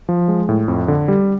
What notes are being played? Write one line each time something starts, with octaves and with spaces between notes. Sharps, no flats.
F3
G#3
A2
F2
D3
G3